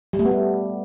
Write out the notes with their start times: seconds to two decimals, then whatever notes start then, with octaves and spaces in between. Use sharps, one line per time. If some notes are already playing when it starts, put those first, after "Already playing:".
0.13 G3
0.19 A3
0.25 B3
0.31 G3